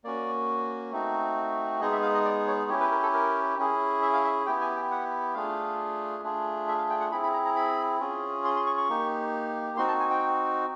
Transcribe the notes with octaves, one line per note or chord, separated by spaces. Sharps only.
A#3 C#4 F#4 D5
A3 C4 D#4 F#4
G#3 B3 D#4 G#4 D#5
E5
F5
D#5
D5
C#5
C#4 E4 G4 C#5
B4
A#4
A4
A#4
C#4 E4 G#4
E5
F5
E5
B3 E4 G4 G5
G#5
G5
F#5
A3 D4 F4 G#4 F5
A3 D4 F4 G#4
E5
F5
G5
F#5
C4 E4 G#4 B5
B5
A#5
A#5
B5
C#4 F4 G#4
C6
C6
C#6
C#6
A#3 D#4 G4
C4 D#4 F#4 C6
A5
G#5
G5